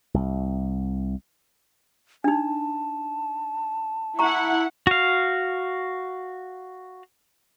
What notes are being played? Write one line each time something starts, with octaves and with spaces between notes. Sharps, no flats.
C2
D4 D#4 A5
E4 F#5 A#5 C#6
F#4 F5